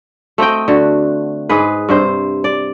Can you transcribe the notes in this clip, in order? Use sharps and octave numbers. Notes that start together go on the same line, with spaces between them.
A3 C4 D#5 G5
D3 F#4
G#2 G#4 B4
G2 C3 C5
D5